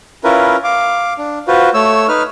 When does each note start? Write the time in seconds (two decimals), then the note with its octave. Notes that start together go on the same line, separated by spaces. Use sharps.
0.24 C#4 E4 F4 A#4 B4
0.64 F5 D6
1.18 D4
1.48 F4 F#4 B4 C5
1.74 A3 C#5 E6
2.08 D#4 B4 F6